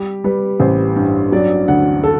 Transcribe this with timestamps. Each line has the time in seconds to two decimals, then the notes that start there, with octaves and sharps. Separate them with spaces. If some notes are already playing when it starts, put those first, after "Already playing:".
Already playing: G3 G4
0.24 G3 B4
0.60 A1 C5
0.96 G2
1.32 F#3 D5
1.68 D2 F#5
2.03 A4